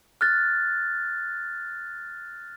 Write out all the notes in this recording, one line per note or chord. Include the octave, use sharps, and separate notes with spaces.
F6 F#6 A6